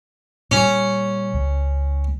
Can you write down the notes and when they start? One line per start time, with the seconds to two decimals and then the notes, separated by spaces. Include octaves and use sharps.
0.51 A#2 G3 C#4
1.34 C#2